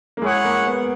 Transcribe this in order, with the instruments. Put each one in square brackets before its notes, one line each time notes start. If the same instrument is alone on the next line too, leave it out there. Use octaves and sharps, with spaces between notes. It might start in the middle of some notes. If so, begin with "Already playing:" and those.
[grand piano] A#3
[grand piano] G#3 [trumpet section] E4 G#4 C#5 F#5
[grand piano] A#3
B3